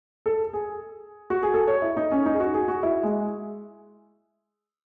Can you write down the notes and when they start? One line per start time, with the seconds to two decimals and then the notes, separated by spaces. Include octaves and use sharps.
0.26 A4
0.53 G#4
1.30 F#4
1.43 G#4
1.54 A4
1.67 C#5
1.82 E4
1.97 D#4
2.12 C#4
2.26 D#4
2.34 G#4
2.40 F#4
2.54 G#4
2.68 F#4
2.83 E4
3.03 G#3